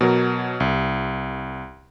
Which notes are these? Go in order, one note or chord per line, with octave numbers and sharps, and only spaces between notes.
B2 F#3 A#4
C2